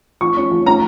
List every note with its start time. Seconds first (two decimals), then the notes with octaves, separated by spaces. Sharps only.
0.21 F3 C#6
0.37 C#4
0.51 F3
0.66 C#4 A#5